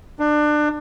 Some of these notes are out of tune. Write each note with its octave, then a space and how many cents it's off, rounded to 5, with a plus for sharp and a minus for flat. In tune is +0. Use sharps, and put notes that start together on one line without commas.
D4 +25